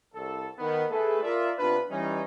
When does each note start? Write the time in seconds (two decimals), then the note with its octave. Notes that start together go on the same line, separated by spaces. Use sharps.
0.15 C2 A4
0.59 D#3 B3
0.90 A3 G#4 A4 B4
1.23 F4 A#4 D5 E5
1.59 C3 B3 D4 F4 B4
1.90 E3 G3 C#4 D#4